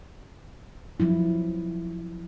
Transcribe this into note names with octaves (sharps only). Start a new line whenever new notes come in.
F3 F#3 E4